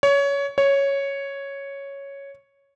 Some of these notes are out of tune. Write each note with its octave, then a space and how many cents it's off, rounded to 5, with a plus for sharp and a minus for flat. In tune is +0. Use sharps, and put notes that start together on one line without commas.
C#5 +20
C#5 +0